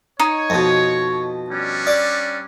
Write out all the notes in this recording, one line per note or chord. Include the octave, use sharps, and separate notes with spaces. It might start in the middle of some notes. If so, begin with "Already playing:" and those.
D#4 C#5
F2 B2
G3 C#4 D4
D5